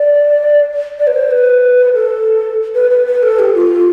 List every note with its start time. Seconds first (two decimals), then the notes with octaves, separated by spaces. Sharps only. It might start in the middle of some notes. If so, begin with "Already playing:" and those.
Already playing: D5
0.99 D5
1.07 B4
1.14 C5
1.31 B4
1.94 A4
2.75 B4
2.90 B4
3.07 B4
3.23 A4
3.39 G4
3.55 F4